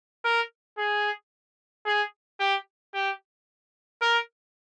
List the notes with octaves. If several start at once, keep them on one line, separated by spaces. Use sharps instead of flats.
A#4
G#4
G#4
G4
G4
A#4